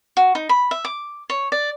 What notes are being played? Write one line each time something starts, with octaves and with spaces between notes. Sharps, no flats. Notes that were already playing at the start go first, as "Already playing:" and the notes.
F#4
D#4
B5
E5
D6
C#5
D5